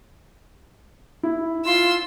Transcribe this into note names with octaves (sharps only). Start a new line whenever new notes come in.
E4
F4 C6 E6